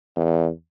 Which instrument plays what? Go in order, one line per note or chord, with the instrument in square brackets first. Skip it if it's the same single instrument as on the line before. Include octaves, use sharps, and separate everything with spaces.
[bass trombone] E2